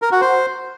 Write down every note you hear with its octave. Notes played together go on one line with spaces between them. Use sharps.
A#4
F#4
C5